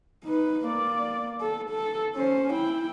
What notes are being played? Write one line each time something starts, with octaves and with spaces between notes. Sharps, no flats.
D#4 B4
A#3 D5
A4
A4
C#4 C5
E4 G5